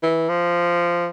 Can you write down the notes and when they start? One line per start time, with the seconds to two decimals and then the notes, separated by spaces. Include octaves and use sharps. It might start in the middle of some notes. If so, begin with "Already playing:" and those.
0.03 E3
0.29 F3